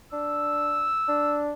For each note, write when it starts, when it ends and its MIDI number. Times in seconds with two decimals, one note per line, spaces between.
0.13 0.93 62
0.13 1.40 88
1.08 1.53 62